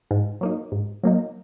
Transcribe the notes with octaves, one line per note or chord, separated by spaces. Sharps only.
G#2
F#3 A#3 D#4
G#2
F#3 A#3 D#4